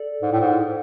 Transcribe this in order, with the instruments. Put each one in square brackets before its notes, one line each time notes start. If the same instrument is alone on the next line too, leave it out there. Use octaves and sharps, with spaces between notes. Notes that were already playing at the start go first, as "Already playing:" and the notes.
Already playing: [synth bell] A4 D5
[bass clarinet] G#2
A2
G#2